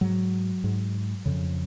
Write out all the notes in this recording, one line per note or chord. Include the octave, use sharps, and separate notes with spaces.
G#2 F#3
G#2
F2 C#3